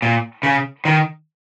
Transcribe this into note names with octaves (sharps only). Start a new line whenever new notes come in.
A#2
C#3
D#3